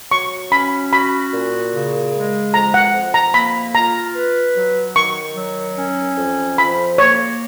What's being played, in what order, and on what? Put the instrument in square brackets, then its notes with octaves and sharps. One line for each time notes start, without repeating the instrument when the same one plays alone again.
[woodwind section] F#3 [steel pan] C#6
[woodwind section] C#4 [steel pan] B5
[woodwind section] F#4 [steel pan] B5
[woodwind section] A#2
C#3
G#3
[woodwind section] F2 [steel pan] A#5
[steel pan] F#5
[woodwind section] F2
[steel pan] A#5
[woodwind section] A#3 [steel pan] B5
[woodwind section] F4 [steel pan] A#5
[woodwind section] B4
F#3
[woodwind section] D#3 [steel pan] C#6
[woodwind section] F#3
C#4
F2
[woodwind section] F3 [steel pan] B5
[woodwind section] A#3 [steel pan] C#5